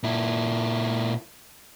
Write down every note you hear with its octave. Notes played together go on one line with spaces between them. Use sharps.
A#2 E4